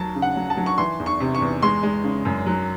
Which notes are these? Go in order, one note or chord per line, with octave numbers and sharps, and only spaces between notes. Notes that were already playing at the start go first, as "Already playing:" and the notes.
Already playing: D#2 F#3 A5
C#3
F#5
F#3
A5
F#3
C#6
E3 C6
E2
C#6
C3
C#6
E2
G#3 C6
G#3
C#3
F#2
F#3